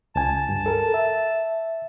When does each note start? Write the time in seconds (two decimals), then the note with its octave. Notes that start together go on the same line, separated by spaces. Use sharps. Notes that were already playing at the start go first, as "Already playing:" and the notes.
0.16 C#2 G#5 A5
0.49 G2
0.66 A4 A#4
0.94 E5